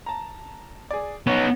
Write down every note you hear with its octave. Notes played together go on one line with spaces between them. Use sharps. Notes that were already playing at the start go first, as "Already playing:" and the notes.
A5 A#5
G#4 D5
B3 C#4 D#4 C#5